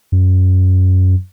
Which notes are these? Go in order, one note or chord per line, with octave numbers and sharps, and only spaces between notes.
F#2